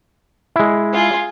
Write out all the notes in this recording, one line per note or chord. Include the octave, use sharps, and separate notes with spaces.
G#3 E4
F4 G#4